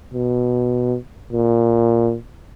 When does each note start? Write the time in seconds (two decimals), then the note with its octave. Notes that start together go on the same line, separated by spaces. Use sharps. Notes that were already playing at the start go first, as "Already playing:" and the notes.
0.14 B2
1.33 A#2